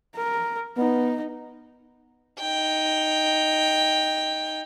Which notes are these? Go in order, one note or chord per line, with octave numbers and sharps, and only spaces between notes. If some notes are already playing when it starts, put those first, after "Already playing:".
A#4
B3 D#4
D#4 G5